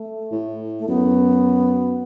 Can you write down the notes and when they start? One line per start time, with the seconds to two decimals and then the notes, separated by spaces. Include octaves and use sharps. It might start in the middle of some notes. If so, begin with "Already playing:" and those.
Already playing: A3
0.32 A2
0.79 A3
0.88 F#2 B3